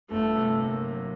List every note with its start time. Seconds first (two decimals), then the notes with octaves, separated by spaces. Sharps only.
0.11 G1 A3
0.35 C3
0.59 A#3
0.83 F#3